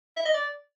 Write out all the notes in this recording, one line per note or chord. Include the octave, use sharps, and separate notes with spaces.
E5
D#5
D5